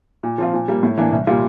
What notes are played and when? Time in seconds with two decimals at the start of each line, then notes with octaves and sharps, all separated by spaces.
0.23 A#2
0.38 F3 C4 F4
0.53 A#2
0.68 G3 A#3
0.83 A2
0.98 E3 A#3 D4
1.12 C2
1.27 A#2 G3 A#3 F4